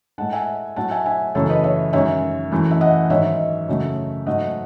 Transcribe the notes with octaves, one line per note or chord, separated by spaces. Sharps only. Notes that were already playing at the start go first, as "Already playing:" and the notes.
A2 G#3 F#5 A5
E5 G#5
A2 F#3 A3 F#5 A5
E5 G#5
E5 G#5
F#2 C#3 E3 A3 A4 C#5
B4 D#5
C#5 E5
F#2 D#3 G#3 C#5 E5
F#2 E3 A3
E5
D#5 F#5
G#2 D#3 F#3 C#5 E5
F#2 C#3 F#3 A3
G#2 F#3 A3 D#5 F#5